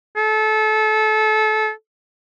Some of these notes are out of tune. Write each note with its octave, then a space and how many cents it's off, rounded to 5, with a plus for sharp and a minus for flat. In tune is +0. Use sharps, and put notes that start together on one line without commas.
A4 -25